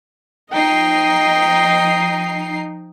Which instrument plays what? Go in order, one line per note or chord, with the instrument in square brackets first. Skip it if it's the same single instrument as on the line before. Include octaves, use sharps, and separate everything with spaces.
[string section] F3 D#4 C7 [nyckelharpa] D#5 G5